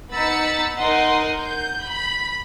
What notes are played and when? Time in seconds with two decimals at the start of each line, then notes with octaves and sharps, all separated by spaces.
0.11 B3 D#4 B5 E6 A6 C#7
0.78 D#4 A#4 D#5 F#5 C6
1.39 G6
1.86 B5